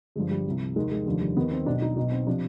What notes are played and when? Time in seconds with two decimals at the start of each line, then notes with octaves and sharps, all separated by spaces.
0.16 G1 G2 F3 G#3
0.31 G3
0.46 C2 C3 F3
0.76 F1 D#2 D#3 G#3
0.91 G#3
1.06 F1 D#2 D3 F3 G3
1.21 G3
1.37 D#2 D#3 B3
1.52 C4
1.66 B1 D4
1.70 B2
1.82 D#4
1.97 B1 B2 D#4
2.12 C4
2.27 C3 F3 D4